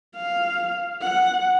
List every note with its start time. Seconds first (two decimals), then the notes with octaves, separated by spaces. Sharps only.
0.16 F5
1.02 F#5